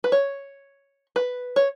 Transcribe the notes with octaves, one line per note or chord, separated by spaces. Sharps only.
B4
C#5
B4
C#5